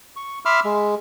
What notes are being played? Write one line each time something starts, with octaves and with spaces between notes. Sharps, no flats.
C#6
E5 B5 C6 D6 E6 F6
G#3